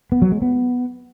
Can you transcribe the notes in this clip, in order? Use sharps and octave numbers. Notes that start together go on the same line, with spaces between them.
B3
F#3
G#3
B3